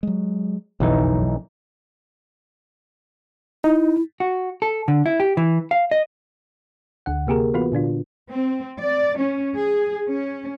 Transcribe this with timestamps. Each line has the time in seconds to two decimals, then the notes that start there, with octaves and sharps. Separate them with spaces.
0.03 F#3 G#3
0.80 F#1 B1 F2 E3 F#3 D#4
3.64 D#4 E4
4.20 F#4
4.62 A4
4.88 D3
5.06 E4
5.20 G4
5.37 E3
5.71 F5
5.91 D#5
7.06 D2 D3 F#5
7.27 C3 A#3 G4 G#4 A#4
7.54 E3 B3 F4 F#4 B4
7.72 A#2 D3 D4 F4
8.30 C4
8.80 D5
9.17 C#4
9.56 G#4
10.08 C#4